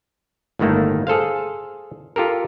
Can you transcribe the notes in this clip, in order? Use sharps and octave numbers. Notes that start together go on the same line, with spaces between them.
G1 A2 D#3 A3 A#3
G#4 A4 C5 F5
F4 G4 A4 A#4